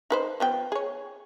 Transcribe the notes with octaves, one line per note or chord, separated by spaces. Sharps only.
D#4 B4 C5
F3 B3 G5
G#4 C#5